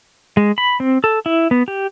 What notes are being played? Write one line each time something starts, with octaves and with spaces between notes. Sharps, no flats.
G#3
B5
C4
A4
E4
B3
G4